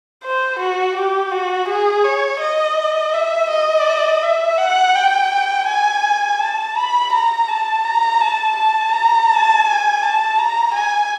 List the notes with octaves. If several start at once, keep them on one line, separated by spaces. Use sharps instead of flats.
C5
F#4
G4
F#4
G#4
C#5
D#5
E5
D#5
E5
F#5
G5
G#5
A5
B5
A#5
A5
A#5
A5
A5
A#5
A5
G#5
A5
A#5
G#5